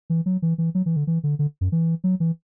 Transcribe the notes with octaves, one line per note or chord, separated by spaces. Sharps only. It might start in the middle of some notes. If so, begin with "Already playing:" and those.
E3
F#3
E3
E3
F#3
E3
D3
E3
D3
D3
F#2
E3
F#3
E3